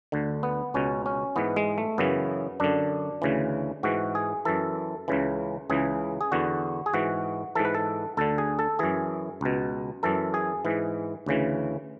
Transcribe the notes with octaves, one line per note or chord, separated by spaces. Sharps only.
D2 D3
B3
C#2 B2 C#4
C#4
G#2 E3 B3
G#3
A3
F#2 C#3 E3 B3
F#2 D3 D4
D2 C#3 E3
G#2 E3 F#4
G#4
F#2 E3 A4
C#2 C#3 E3
C#2 C#3 E3 G#4
G#4
E2 D3 F#4
G#4
G#2 E3 F#4
G#2 E3 A4
B4
A4
D2 D3 A4
G#4
A4
F#2 E3 G#4
C#2 B2
F#2 E3 A4
G#4
G#2 E3
D2 C#3 E3